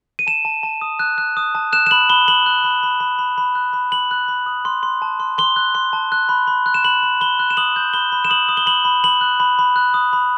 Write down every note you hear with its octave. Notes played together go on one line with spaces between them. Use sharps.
D#7
A5 E7
A5
A5
D#6
F#6
F#6
D#6
A5
F#6 E7
E7
B5 F#7
B5 G7
B5 F#7
F#6
B5
B5
B5
B5
B5
F#6
B5
B5 F#7
F#6
B5
D#6
C6
C6
A5
C6
C6 G7
F#6
C6
A5
F#6
B5
B5
F#6
E7
B5 F#7
B5
B5 G7
F#6
E7
D#6 F#7
G6
B5 G7
B5
E7
D#6 F#7
D#6
G7
B5 F#7
B5
B5 F#7
F#6
B5
B5
F#6
D#6
B5